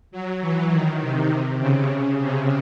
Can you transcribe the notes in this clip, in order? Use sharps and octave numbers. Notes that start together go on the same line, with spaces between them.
F#3
E3
D#3
C3
C3
C#3
C3